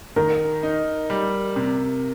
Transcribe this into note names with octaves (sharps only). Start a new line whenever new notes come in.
D#3 A#4
D#4
G3
C3